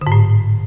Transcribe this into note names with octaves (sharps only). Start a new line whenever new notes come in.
D3
G#2
A2